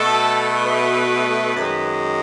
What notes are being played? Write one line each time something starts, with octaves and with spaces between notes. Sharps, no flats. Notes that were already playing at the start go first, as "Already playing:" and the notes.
Already playing: B2 A3 A4
B4
F#2 D#3 G#3